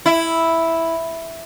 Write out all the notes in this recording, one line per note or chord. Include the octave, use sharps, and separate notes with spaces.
E4